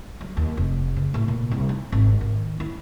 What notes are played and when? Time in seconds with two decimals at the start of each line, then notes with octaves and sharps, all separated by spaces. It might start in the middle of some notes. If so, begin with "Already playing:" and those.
0.21 F#3
0.37 D#2
0.57 F1
0.96 C#3
1.14 A2
1.28 A#2
1.51 C2
1.69 D#4
1.92 G#1
2.21 D#3
2.60 E4